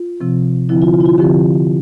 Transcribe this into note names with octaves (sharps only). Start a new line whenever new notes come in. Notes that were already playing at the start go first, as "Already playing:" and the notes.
Already playing: F4
C3 F3 C4
D3 F3 C4 E4
F4
F4
E4
F4
D3 F3 C4 G4